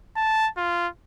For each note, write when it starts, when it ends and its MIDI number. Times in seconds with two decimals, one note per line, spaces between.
0.17 0.49 81
0.58 0.88 65